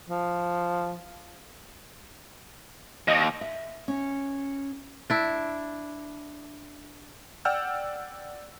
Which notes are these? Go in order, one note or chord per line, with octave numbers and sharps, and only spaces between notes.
F3
D#2 D#5
E5
C#4
D4 E4
D5 F#5 G5 E6 F6 G6